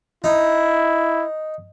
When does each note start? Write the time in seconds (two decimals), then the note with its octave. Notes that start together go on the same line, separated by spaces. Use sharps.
0.24 D#4 E4